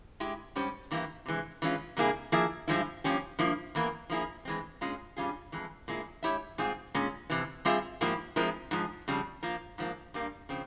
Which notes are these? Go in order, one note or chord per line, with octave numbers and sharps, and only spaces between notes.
G#3 E4 G4
G#2 G3 C#4 G4 C5
G2 E3 A#3 E4 G4
C3 E3 G#3
E3 G#3 C#4 F4
C3 G3 A#3 E4 G#4
F3 A#3 E4 G#4 E5
G2 F3 G#3 E4
G2 F3 A#3 C#4 G4
G2 F3 A#3 E4
E2 E3 A#3 E4 A#4
F3 A#3 E4 G#4
E3 G#3 C4
A#2 G#3 C#4 F4
G2 G3 C#4 F4 G#4
F2 E3 G#3
A#2 G#3 E4
G#3 E4 G4 C#5 E5
G#2 G3 C4 F4 G#4
A#2 G#3 C#4
F2 C3 E3
G3 C4 F4 G#4 E5
G#2 F3 A#3 E4 G4
F3 G#3 C4 E4 A#4
G#2 F3 G#3
F2 C#3 G3
F3 A#3 F4
G#2 F3 A#3
G2 G3 A#3
C#3 F3 C4